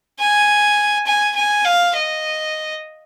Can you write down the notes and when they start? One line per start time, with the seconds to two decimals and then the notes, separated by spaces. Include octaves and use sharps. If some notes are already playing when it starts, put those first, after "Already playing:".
0.19 G#5
1.06 G#5
1.36 G#5
1.65 F5
1.94 D#5